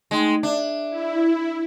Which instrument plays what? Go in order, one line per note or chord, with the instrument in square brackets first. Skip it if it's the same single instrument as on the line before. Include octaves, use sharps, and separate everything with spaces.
[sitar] G#3 [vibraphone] A3 D#4 G5
[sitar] D4 [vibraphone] E5
[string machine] E4